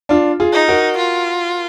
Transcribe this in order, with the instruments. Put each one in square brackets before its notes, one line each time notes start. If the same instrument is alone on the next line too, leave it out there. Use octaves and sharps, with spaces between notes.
[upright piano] D4 F4
F4 G#4
[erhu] D#4
[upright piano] F#4 A#4
[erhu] F4